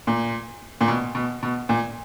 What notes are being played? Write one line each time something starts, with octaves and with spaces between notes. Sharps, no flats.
A#2
A#2
B2
B2
B2
A#2